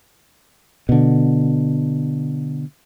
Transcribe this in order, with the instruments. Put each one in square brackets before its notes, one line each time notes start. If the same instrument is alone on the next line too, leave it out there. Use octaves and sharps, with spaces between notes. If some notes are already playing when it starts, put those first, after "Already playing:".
[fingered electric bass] B2 D3